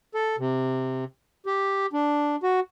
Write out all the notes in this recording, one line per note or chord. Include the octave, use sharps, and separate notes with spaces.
A4
C3
G4
D4
F#4